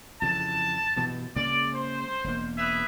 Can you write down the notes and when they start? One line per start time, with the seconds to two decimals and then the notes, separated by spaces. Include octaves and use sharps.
0.22 F2 C#3 E3 A5
0.96 G2 B2 E3
1.36 C#3 G#3 A#3 D5
1.74 C5
2.24 E1 A#3
2.57 G#4 B4 E5